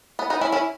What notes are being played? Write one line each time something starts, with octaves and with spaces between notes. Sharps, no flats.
B3
B3 D#4
C#4 E4
C#4 E4